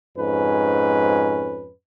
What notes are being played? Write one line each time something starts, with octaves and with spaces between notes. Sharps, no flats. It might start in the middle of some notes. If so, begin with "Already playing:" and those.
F2 G#2 C#4 B4